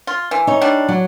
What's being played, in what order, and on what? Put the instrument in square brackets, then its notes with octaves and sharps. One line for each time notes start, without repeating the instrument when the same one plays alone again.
[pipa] F4
E3
[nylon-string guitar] D#4 C#5
[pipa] G3 D4
[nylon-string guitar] F#3